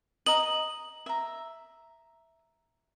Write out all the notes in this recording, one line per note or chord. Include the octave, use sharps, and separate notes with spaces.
D#5 A#5 F#7
E5 A#5